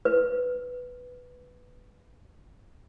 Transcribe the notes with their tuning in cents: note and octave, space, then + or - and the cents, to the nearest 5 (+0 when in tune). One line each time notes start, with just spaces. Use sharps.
B4 +5